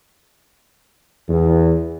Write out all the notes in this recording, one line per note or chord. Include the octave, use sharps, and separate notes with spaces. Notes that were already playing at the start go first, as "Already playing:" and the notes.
E2